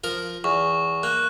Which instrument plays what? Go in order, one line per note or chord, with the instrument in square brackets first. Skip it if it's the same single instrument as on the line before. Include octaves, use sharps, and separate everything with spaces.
[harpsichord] F3 A#4
[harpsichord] E2 [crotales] C#6
[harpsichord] A#3 [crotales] F#6